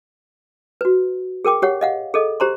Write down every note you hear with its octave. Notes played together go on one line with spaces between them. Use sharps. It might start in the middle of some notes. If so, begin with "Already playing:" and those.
F#4 B4
G#4 A#4 G5 D6
G4 C#5 F#5
D#5 F5 F#5
G#4 A4 D#5
G4 C5 A#5 C6